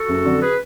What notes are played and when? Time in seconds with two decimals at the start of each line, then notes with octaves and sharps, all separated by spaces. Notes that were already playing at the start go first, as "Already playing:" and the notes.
Already playing: F#4 A4
0.09 F#1
0.24 F2 D3 F#3
0.41 G#4 B4